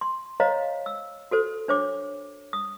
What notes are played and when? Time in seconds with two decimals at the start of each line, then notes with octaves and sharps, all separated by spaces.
0.01 C6
0.40 C5 C#5 D#5 F5 A#5
0.86 E6
1.31 F#4 A4 C5
1.68 D4 C5 C#5 D6
2.53 D#6